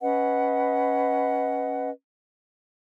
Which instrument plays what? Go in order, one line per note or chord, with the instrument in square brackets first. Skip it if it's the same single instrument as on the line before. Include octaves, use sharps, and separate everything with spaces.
[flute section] C#4 B4 D#5 F#5